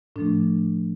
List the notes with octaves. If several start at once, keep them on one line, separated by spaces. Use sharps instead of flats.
A2 F3 A3 D4